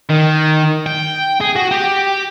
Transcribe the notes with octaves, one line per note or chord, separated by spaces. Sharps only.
D#3
G5
G#4
F#4
G4